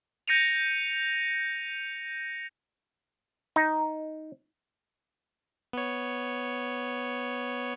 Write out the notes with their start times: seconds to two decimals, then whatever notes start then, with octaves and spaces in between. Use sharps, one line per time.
0.28 G6 A#6 C#7 D#7 F7
3.56 D#4
5.73 B3 C#5